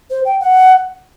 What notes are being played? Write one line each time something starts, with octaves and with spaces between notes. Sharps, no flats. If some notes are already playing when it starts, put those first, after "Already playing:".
C5
G5
F#5